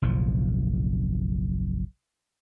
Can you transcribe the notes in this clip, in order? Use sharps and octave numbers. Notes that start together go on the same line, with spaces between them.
F#1 B1 A2 F3